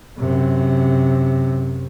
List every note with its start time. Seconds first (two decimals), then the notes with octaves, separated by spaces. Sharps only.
0.18 F#2 C3